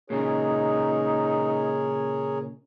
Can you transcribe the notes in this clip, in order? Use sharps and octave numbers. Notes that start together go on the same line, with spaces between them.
A#2 C#3 D#4 G#4 A#4 C#5